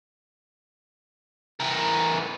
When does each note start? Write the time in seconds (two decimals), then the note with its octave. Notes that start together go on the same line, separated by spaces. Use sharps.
1.60 E3 A#4